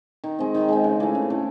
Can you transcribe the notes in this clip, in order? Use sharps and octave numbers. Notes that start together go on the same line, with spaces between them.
D#3
G#3 C4
D#3
G#3 C4
C#3
E3 A3
C#3
E3 A3